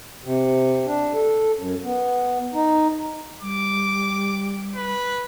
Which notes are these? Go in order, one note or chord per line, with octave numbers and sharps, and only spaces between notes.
C3
D4
A4
F#2
B3
D#4
G3 D6
B4